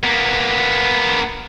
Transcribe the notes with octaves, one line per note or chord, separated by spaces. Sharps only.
A#3 B3